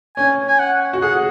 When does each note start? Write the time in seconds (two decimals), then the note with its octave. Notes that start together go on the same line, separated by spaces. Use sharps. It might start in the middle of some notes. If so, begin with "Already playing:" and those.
0.17 C#4 G#5
0.48 G#5
0.59 F#5
0.93 F#4
1.02 G#4 F#5